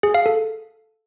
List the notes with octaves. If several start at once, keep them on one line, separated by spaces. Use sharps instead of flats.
G#4
F5
A4